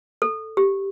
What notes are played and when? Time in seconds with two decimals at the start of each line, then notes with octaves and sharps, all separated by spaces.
0.22 A4
0.57 G4